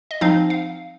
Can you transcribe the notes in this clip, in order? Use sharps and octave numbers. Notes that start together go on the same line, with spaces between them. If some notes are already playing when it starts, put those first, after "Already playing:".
D#5
F3 C4 D#4 F5
F5